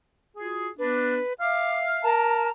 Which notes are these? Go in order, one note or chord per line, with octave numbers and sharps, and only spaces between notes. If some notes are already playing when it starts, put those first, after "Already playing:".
F4 F#4 G#4
B3 D4 B4
E5 F5 D6
A#4 A5 A#5